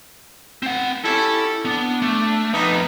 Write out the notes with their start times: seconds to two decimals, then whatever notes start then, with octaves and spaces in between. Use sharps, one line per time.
0.63 C4 F#5
1.05 C#4 E4 G4 A4
1.65 B3 D4
2.02 A3
2.54 F2 B3 D#4